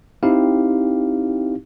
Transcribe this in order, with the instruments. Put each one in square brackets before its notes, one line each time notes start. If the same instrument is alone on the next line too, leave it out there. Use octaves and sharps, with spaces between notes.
[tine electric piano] C4 D#4 E4 G4 F5